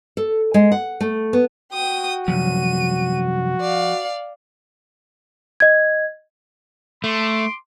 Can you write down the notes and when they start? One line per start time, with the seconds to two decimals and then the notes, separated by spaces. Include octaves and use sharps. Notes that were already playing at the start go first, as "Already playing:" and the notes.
0.17 A4
0.54 G#3
0.72 F#5
1.01 A3
1.33 B3
1.73 F#4 G5 D#6
2.28 C2 F#2 F3 D#7
3.61 D5 F5
5.60 D#5 G#6
7.04 A3 C6 D6